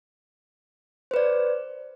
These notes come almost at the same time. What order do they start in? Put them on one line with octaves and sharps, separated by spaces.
C5 B4 D5